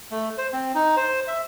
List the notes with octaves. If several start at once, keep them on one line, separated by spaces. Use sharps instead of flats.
A3
C5
C4
D#4
C5
E5